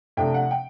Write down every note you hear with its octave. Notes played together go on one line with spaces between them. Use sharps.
C3 F3 A3 D4 G5
F#5
G5